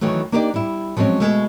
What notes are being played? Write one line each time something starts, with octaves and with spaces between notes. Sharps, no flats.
D#3 E3 F#3 A3
A#3 D4 D#4 G4 C5 D5
G3 E4
F3 F#3 G#3 C4 C#4
B2 G#3 A3